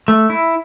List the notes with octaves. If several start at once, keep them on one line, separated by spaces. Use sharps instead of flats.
A3
E4